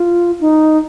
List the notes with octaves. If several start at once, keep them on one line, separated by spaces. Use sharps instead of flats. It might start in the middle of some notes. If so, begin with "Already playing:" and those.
Already playing: F4
D#4